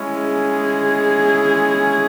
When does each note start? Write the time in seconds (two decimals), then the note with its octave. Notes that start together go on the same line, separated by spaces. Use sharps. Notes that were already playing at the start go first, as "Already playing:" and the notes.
Already playing: G#3 C#4 E4
0.12 G#4